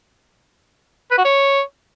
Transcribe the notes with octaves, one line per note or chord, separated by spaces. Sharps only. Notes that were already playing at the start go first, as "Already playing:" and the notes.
B4
F#4
C#5